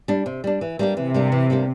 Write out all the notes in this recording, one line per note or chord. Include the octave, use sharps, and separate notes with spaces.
G3 D4
C3
G3 D4
E3
G3 A#3 D4 G4
C3 E3
G3 A#3 D4 G4
E3
G3 A#3 D4 G4